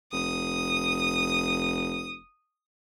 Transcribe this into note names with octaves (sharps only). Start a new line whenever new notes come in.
F1 D#6